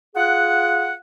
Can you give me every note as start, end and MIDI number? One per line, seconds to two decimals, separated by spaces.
0.15 0.95 65
0.15 0.95 68
0.15 0.95 78